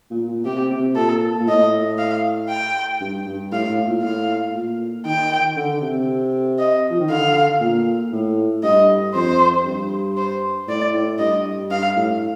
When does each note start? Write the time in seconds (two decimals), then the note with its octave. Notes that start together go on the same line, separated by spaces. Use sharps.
0.11 A#2
0.28 A#2
0.45 C3 G4
0.70 C3
0.95 A#2 A4
1.40 A#2
1.47 A2 D#5
1.98 F5
2.49 G5
3.01 G2
3.26 G2
3.52 A2 F5
3.69 A2
3.86 A#2
4.02 A2 F5
4.54 A#2
5.05 D#3 G5
5.57 D3
5.82 C3
6.59 D#5
6.90 F3
7.00 D#3
7.10 D3 F5
7.61 A#2
8.12 A2
8.63 G2 D#5
9.14 F2 C5
9.66 G2
10.17 C5
10.68 A2 D5
10.94 A2
11.19 G2 D#5
11.70 G2 F5
11.96 A2